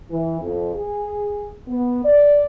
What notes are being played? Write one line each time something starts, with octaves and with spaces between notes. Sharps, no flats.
E3
F2
G#4
B3
D5